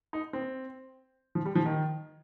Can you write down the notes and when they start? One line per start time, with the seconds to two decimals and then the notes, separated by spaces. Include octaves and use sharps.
0.13 D#4
0.33 C4
1.35 F3
1.45 G3
1.55 F3
1.66 D#3